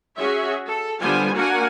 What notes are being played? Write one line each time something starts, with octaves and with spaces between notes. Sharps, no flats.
C#4 F#4 G#4 C#5 E5
A4
D3 G3 B3 F4 C5 G#5
A#3 D4 F#4 A#4 F#5 G#5